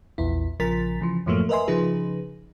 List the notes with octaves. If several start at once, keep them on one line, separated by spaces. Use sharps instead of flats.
A#1 E2 E4
A#1 C#3 F3 A#4 A6 B6
C#3 E3 F3
F#2 A2 F3 F#3 A3 A#3
A#4 B4 D#5 E5 G#5 C6
C#3 F3 D#4 G#4 B4